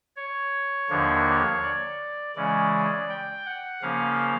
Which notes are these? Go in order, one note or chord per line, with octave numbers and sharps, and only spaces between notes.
C#5
D#2 D3 F3 A#3 D4
D5
C#3 E3 G#3 C#4 D5
G5
F#5
C#3 F3 A#3 C#4 F5